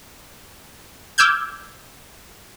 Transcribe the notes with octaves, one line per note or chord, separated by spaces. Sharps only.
D6 E6 F6 G6 G#6